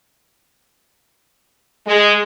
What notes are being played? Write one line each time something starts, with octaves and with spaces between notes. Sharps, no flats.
G#3